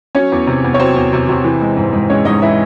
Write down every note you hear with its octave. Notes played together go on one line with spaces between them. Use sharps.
F#3 C#4 C#5
E2
C3
E2
C#5
F#3 C4 C5
E2
C3
C3
E3
G#3
G#2
G#2
G#3 C#4 C#5
G#2 D#4 D#5
E3 E4 E5